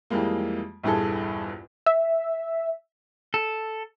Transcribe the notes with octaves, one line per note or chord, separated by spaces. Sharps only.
F2 E3 G3 G#3 A#3
A#1 E2 G2 G#4 A4
E5
A4